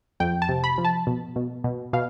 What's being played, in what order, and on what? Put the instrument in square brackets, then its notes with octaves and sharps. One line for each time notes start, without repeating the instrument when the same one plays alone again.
[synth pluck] F2 G5
A5
C3
B5
F3
A5
B2
B2
B2
B2 F5